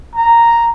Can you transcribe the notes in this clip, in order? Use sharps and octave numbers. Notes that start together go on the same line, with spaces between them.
A#5